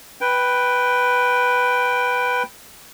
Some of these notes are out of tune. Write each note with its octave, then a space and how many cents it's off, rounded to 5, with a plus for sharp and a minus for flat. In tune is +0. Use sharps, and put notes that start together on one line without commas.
B4 +0 G5 +0